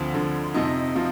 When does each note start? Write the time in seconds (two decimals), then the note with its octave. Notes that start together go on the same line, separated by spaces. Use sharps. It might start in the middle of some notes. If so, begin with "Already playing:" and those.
Already playing: D2 D3 F3 C4
0.14 D2 D3 F3
0.54 F2 C3 F3 D#4
0.95 C3 F3 F4